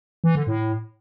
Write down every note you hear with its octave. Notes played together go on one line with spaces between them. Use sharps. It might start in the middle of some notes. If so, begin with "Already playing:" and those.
E3
D3
A2